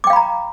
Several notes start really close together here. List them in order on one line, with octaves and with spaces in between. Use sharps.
D6 G5 F5 B5 A#5